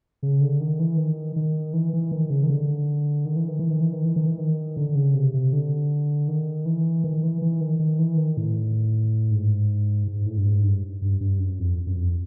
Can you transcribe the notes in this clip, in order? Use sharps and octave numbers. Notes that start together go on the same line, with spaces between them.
C#3
D3
D#3
E3
D#3
D#3
E3
E3
D#3
C#3
D#3
D3
D#3
E3
D#3
E3
D#3
E3
D#3
E3
D#3
E3
D#3
D3
C#3
C3
C3
D3
D#3
E3
D#3
E3
E3
D#3
D#3
E3
D#3
A2
G#2
G#2
A2
G2
G#2
G2
G2
G2
F#2
F2
F#2
F2